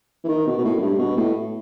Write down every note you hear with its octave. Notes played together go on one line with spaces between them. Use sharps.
E3
D#3
B2
B2
A2
F#2
G2
B2
A2